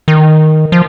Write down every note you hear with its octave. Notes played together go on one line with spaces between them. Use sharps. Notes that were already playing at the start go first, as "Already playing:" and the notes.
D#3
F3